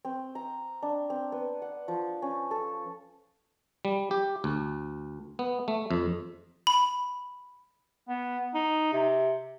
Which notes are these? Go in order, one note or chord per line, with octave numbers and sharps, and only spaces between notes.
C4
A#5
D4
C4
B3
F#5
F3
C#4
A4
G3
G4
D2
B3
A3
F2
B5
B3
D#4
C3